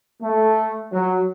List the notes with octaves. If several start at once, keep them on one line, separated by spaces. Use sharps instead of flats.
A3
F#3